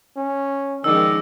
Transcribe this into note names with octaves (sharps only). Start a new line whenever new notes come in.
C#4
D#3 F3 G#3 C#4 D#4 D5 E6